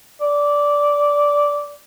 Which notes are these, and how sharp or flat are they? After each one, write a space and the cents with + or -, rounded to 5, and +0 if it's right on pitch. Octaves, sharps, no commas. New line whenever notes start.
D5 -10